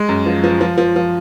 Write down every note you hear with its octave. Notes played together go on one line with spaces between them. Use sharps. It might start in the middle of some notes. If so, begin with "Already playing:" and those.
Already playing: G#3
F#2
F3
F3
F3
F3
F3